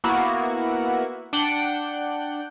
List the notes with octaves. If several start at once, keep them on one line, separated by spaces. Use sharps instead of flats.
A#3 B3 E4 F#4
D4 F#5 G5